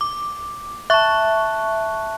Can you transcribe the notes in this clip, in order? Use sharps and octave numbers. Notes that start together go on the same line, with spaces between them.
D6
E5 A5 C#6 F#6